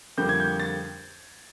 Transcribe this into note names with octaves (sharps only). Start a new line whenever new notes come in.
F2 D3 G3 A#3 G6
G#6
G6
A6